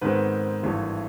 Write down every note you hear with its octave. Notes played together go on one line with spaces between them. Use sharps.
G#2 D#3 G#3 B3 C4 B4
G#1 G2 E3 A3